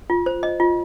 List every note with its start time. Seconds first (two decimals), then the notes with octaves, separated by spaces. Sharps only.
0.10 F4
0.26 C5
0.43 D#5
0.60 F4